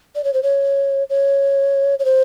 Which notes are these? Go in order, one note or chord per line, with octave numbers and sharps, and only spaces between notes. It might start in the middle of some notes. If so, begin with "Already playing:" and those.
D5
C#5
C5
C#5
C#5
C#5
C5